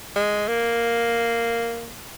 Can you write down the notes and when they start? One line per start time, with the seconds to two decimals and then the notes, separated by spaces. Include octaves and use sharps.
0.16 G#3
0.48 A#3